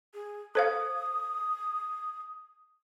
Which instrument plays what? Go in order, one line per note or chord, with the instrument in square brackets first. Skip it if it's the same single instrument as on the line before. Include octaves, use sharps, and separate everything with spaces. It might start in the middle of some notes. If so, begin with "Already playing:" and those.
[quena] G#4
[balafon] A4 C5 F5 [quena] D#6